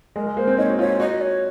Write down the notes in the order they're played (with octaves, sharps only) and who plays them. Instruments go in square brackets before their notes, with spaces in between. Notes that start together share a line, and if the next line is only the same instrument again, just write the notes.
[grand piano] G#3 [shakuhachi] A#4
[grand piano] G#3
[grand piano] A#3 [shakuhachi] C5
[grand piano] C4
[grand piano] D#4 [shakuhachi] C#5
[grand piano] F#4
[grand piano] F4 [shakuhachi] C#5
[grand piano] F#4 [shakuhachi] D#5
[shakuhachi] C#5